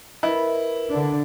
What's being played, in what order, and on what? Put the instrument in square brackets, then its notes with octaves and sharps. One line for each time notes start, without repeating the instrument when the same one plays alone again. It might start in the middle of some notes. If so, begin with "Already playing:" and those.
[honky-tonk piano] E4 [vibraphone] A#4 B4 [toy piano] D#5 E5 B5
[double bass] D3 D4